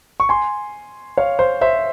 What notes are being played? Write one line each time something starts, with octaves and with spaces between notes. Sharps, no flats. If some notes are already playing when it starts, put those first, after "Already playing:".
C#6
G#5 C6
C#5 F5
C5
C5 E5